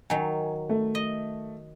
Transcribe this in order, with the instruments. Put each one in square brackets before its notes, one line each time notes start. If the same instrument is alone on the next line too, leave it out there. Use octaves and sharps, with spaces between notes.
[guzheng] D#3 F#3 [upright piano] G#5
[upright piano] A3
[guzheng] D#5